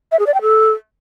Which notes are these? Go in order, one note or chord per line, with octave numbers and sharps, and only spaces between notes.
E5
G#4
D5
G5
A4